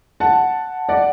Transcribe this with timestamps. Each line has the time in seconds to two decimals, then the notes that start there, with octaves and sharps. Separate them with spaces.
0.20 F#5 A5
0.89 D5 F#5